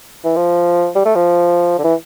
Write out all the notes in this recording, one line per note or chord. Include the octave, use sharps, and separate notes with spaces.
E3
F3
G3
A3
F3
D3
E3